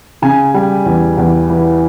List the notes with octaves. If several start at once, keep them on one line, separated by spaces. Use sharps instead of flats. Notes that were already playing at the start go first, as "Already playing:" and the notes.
C#3 G#5
G3
E2
E2
E3